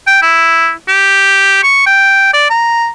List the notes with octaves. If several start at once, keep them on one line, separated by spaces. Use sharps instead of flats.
G5
E4
G4
C#6
G5
D5
A#5